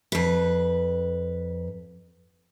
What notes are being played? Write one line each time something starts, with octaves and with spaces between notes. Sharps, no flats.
F2 B4